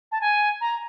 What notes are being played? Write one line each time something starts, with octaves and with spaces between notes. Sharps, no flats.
A5
G#5
A#5